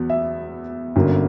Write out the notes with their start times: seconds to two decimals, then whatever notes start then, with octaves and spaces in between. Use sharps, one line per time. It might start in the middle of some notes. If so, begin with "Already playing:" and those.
Already playing: E2 F#3 B3
0.10 E5
0.95 G1 F#2 D3 F#3 A#3